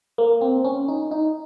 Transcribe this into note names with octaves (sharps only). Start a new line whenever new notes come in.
A#3
C4
C#4
D#4
D#4